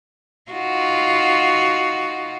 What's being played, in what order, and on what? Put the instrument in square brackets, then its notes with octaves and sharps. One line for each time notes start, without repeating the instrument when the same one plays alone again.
[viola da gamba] D#4 F4 F#4